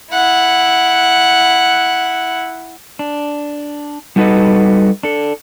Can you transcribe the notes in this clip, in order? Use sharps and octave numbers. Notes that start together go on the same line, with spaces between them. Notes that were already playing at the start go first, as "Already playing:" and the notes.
E4 F#5
D4
G3 D#4 F#4 A4 B4 D#5
D4 A4